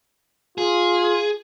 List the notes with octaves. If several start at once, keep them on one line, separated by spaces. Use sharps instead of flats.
F4 G#4